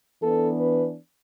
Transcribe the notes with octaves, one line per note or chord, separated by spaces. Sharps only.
E3 B3 D4 A4
B4